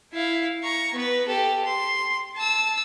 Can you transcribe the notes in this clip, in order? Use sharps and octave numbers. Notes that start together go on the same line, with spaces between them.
E4 F5
A#5 C#6
B3 B4
G4 A4
C6
A5 E6